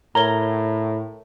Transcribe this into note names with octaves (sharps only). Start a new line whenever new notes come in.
A2 A#4 C#5 A#5 G7